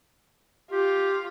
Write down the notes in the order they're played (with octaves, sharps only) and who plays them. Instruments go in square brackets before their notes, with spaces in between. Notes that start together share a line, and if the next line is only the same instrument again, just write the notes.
[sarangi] F4 [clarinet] G4